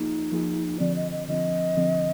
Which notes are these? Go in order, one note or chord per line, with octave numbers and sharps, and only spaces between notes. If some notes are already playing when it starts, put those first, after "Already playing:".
Already playing: F3 A#3 D#4 F4 G#4
F3 A#3 F4 G#4
D3 F3 C4 D5
D#5
D#5
D3 F3 C4 D#5
D3 F3 C4